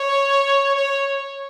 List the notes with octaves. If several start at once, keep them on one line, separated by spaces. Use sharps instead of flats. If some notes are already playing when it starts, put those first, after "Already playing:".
Already playing: C#5
C#5